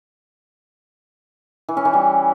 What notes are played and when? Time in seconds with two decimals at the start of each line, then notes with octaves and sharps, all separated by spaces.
1.69 E3
1.77 C#4
1.85 E3
1.93 G3